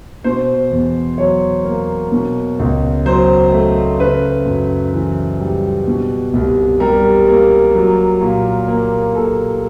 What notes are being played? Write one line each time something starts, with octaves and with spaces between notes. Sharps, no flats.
B2 C5
E2
F#3 C#5
A#3
B2
C#2
F#3 C5
A3
C#3 B4
F#2
E3
G3
B2
C2
G3 A#4
A#3
F#3
A#2
A#3
A#2 A4